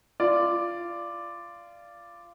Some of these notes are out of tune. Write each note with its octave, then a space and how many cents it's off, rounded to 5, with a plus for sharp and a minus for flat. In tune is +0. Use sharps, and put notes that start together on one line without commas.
F4 -20 D5 +0